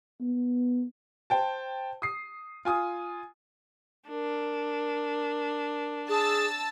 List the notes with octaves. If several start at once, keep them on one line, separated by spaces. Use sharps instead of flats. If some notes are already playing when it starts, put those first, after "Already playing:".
B3
C5 G5 A5
D#6 C7
F4 G#5 D#6
D4 A#4
G#4 A5 E6 A6